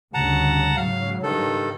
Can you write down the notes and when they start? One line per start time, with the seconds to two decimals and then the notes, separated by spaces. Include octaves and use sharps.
0.14 D2 G2 C#3 F#5 A5 A#5
0.77 G#2 C#3 F#3 F5
1.23 G2 D#3 A4